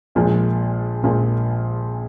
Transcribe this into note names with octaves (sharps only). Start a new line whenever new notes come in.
A#1 A#2 F3 G#3
A#1 A#2 F3 G#3